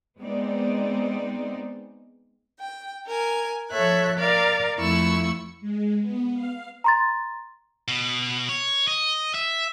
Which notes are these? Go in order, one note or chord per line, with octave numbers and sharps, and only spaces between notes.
G#3 B3 C4 D#4 D5
G5
A#4 G#5
F3 A4 C#5 E5 F#6
A#4 D5 F5
F2 A3 E4 C#6 E6
G#3
B3
F5
A#5 C6 A6
B2
C#5
D#5
E5